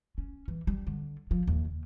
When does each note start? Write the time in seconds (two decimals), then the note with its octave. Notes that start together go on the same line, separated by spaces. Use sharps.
0.18 C#4
0.48 E3
0.67 G3
0.87 D3
1.31 F3
1.47 D#2
1.65 C#3